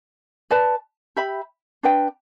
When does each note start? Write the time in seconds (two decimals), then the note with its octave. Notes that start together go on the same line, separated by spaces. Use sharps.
0.51 B4 D5 A5
1.16 G4 E5 B5
1.83 D4 B4 G5